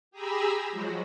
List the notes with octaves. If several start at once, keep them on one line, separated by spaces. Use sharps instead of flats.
G4 G#4 G#5 A#5 B5 E6
F3 F#3 G#3 F#4